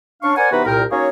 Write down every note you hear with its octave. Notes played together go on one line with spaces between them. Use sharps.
C#4 D4 F5 C#6
A#4 C5 D5 F#5 G#5
C3 E3 B3 D#4 F#4 B4
C2 A#2 A#4 G5
A#3 C#4 D#4 F#4 G#4 C#5